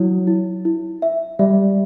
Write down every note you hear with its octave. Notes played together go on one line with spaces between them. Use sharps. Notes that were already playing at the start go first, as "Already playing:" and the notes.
Already playing: F#3 E4
E4
E4
E5
G3 E5